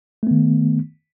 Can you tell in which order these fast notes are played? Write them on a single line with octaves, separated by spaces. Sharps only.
A3 B3 D#3